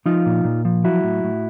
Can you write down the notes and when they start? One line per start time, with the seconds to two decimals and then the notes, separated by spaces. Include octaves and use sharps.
0.06 F3 D#4 F4
0.26 A#2
0.44 A#2
0.65 F3
0.84 F#3 E4 F#4
1.04 A2
1.24 A2